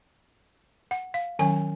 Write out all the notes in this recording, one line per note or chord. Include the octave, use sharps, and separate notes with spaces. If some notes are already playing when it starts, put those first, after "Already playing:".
F#5
F5
D#3 F#3 C#4 G#5